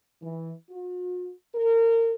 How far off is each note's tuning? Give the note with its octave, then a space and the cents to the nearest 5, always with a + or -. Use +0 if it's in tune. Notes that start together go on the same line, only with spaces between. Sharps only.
E3 -10
F#4 -45
A#4 -30